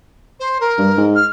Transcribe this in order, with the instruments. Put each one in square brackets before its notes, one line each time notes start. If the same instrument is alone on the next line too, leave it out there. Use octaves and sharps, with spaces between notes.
[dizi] C5
A#4
[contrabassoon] G2
G#2
[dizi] F6